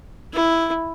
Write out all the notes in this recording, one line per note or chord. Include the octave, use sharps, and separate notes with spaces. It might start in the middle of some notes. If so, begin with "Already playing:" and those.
E4